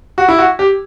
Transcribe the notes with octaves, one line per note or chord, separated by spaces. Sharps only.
F#4
E4
F#4
G4